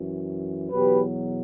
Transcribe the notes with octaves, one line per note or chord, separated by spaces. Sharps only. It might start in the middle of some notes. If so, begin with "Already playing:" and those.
Already playing: F#2 E3
E2 B2 F#3 G4 B4